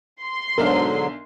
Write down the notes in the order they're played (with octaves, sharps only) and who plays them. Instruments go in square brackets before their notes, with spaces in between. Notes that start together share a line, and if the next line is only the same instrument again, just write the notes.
[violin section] C6
[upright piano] B1 D4 E5 [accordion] G#2 D3 F#3 [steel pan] A#4